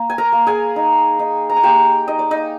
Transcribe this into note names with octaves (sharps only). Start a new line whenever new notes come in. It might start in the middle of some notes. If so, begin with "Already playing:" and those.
Already playing: A#3
G#5
A#4 A#5
A#3
G#4 G#5
D#4
D#4
A#5
G#5
A#3 G4 G5
D#4 D#5
D5
D#4 D#5